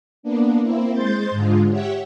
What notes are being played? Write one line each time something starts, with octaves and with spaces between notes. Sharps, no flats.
A#3 B3 D4
A#3 C4 E4
G#3 C5 C6 G6 A6
G#2 D3 G#3 F4
G4 C#5 E5 F#5 G5